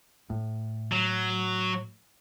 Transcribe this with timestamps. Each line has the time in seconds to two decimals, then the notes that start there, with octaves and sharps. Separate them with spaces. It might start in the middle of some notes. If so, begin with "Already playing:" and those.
0.30 A2
0.92 F#3